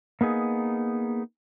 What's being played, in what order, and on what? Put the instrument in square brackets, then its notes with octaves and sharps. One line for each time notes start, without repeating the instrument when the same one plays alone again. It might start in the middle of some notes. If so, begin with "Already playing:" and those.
[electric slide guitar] A#3 B3 D#4 G#4